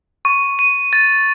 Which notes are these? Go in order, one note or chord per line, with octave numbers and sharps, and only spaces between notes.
C#6
D#7
A6